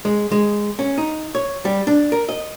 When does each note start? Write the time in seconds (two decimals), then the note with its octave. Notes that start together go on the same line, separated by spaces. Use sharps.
0.05 G#3
0.32 G#3
0.79 C#4
0.98 D#4
1.35 C#5
1.65 G3
1.87 D4
2.12 A#4
2.29 D#5